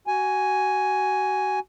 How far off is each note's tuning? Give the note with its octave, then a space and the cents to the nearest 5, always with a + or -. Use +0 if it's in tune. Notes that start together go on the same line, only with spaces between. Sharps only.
F#4 +25 G#5 +0